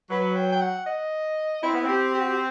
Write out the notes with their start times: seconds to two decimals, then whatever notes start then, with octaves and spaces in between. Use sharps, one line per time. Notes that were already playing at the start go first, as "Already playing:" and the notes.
0.10 F#3 B4
0.36 G5
0.52 G5
0.61 F#5
0.86 D#5
1.63 C4 E4
1.74 B3
1.84 C4 G4
2.14 G4
2.21 F#4
2.29 G4